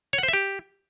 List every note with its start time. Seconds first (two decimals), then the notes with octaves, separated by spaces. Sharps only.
0.13 C#5
0.18 F#5
0.23 C5
0.28 E5
0.33 G4